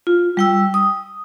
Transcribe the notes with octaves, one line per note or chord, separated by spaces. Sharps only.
F4
G3 G5 E6
D#6